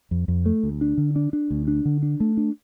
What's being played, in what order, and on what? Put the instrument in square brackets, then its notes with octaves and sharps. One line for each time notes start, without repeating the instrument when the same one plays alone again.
[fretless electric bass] F2
F2
A3
D2
D4
D3
D4
D4
D2
D4
D3
D4
A3
D4